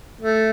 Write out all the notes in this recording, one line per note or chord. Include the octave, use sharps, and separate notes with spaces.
A3